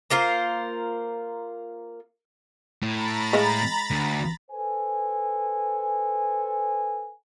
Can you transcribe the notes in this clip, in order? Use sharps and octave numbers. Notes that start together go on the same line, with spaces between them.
A#3 F4 A#4 C5
A2 A#5 B5 A6
G#3 D#5 F5
D2
A4 B4 C5 G#5